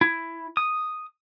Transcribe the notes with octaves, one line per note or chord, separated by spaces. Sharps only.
E4
D#6